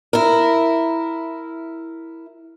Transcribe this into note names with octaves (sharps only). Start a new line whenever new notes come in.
E4 A#4